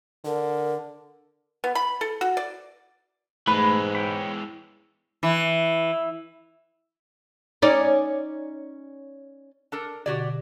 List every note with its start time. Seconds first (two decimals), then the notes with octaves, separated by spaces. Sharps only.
0.25 D3 A#4
1.64 B3
1.75 B5
2.01 A4
2.21 F#4
2.37 D5
3.47 G#2 E3 G#3 A3 B4
3.95 C#5 G5 B5
5.23 E3
7.62 C#4 D#4 D5
9.72 D4 A4 A#4
10.06 B2 D3 F#4 G4 D5 G#6